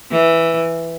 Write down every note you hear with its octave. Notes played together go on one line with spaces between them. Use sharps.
E3